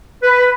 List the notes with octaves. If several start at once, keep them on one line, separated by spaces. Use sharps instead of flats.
B4